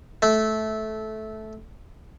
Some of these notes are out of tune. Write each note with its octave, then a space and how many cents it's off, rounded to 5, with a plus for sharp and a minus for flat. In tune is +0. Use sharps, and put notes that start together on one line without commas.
A3 -15